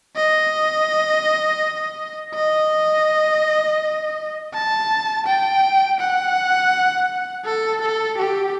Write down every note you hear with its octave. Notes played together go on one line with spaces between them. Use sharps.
D#5
D#5
A5
G5
F#5
A4
A4
G4